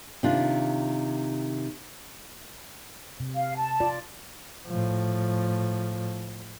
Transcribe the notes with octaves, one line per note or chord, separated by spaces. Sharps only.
C3 D#3 D4 F4
C3
F5
A5
F4 D5
A2 F3